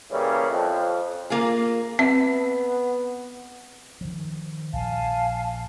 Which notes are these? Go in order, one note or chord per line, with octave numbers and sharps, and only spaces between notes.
C#3 E3 G3 A#3 C#4
F2
A#3 F4 G#4
B3 C4 E5
D#3 F3
A#1 F5 G#5 A5